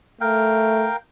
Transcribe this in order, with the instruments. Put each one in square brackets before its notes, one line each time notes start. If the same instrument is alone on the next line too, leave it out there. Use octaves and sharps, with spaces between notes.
[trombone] A3 [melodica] A#4 F5 G5